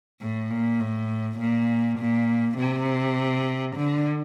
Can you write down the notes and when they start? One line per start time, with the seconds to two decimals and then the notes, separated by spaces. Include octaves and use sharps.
0.21 A2
0.51 A#2
0.80 A2
1.40 A#2
1.99 A#2
2.58 C3
3.77 D3